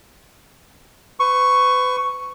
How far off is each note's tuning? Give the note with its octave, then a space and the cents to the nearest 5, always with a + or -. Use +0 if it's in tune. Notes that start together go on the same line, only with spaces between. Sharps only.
B4 +35 C#6 +0